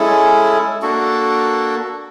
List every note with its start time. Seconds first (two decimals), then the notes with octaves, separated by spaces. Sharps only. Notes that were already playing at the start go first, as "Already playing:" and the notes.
Already playing: G#3 C#4 E4 A4
0.82 A#3 D4 F#4 A4